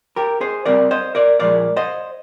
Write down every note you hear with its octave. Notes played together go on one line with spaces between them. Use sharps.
G4 A#4
G#4 C5
C2 C3 G3 C4 A#4 D5
C5 D#5
A#4 D5
A#2 F3 G#3 A#4 D5
C5 D#5